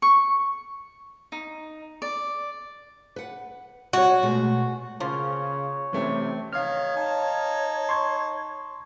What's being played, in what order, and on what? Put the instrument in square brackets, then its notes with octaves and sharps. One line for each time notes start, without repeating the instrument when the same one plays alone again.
[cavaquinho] C#6
D#4
D5
[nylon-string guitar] B4 F#5
[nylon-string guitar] G3 C#5 [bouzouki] F#4
[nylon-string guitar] B2 G#3 A3
[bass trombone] C#3 [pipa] F3 A#3 F4 [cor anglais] C#5
[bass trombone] C3 [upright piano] E3 A3 C#4
[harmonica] D#3 [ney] C#5 [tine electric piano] F5 F6
[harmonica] D#4 A5
[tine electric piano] C6 C#6 G#6